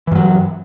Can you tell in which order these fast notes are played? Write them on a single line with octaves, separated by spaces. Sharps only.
E3 G2 F#3